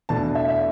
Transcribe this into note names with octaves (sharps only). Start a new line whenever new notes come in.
E2 B2 A3 D4 A5
E5
E5